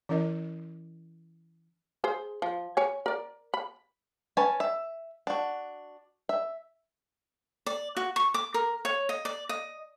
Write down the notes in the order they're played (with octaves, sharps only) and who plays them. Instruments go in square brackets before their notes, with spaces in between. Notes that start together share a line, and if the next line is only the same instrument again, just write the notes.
[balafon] E3 C#4 E4 A#4 D#5
[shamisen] G#4 C5
F3
C#5 G#5
A#4 D5
B5
[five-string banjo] C#4 B4 C#5 G#5 A5
E5
D4 F#4
E5
[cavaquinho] D5
F#4
C#6
D6
A#4
C#5
D#5
D5
D#5